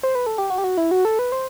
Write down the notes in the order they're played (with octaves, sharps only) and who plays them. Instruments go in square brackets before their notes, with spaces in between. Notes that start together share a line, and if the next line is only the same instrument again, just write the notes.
[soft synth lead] C5
B4
A4
G4
F#4
G4
F#4
E4
F#4
A4
B4
C5